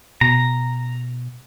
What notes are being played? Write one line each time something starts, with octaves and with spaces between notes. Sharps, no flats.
B2 A#5